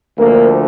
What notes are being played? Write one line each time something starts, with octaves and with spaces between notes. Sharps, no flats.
D2 D3 F3 A#3